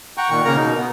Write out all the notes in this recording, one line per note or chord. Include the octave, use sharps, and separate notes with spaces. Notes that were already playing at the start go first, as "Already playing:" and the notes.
F#5 G5 A#5 C#6
A#2 D#3 C#6
C#3 A#3 A#4 A#5
B2 D#4
B3